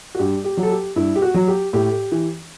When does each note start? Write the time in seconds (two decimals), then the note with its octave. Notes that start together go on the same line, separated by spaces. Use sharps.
0.15 F#4
0.19 G2 G4
0.44 G4
0.57 F#3
0.63 A4
0.71 G4
0.96 G2 E4
1.16 G4
1.22 F#4
1.34 F#3
1.48 G4
1.73 A2 G4
2.12 E3